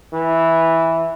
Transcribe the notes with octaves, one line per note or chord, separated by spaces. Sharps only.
E3